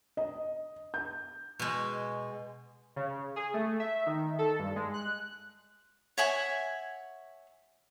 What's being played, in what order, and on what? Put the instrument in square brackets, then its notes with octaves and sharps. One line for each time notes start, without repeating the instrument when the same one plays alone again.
[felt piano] D#5
G6
[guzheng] B2 G#3
[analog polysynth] C#3
G#4
A3
E5
D#3
A4
G2
G#3
F#6
[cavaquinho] C#5 E5 F#5 G#5